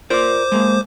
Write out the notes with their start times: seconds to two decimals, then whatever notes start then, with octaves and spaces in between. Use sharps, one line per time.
0.10 F4 A#4 C5 D5 D6
0.52 G#3 A#3